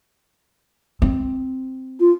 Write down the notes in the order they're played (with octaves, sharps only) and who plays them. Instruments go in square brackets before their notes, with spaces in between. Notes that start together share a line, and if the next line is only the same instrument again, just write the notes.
[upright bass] C4
[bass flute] F4